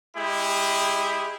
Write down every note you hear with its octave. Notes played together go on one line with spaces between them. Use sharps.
G#3 E4 G4 G#4